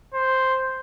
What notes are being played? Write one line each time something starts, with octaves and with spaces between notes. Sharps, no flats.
C5